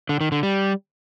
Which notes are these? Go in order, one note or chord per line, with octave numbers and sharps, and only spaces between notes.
D3
D#3
D3
G3